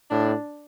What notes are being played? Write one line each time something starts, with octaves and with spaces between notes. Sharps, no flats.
A2 D4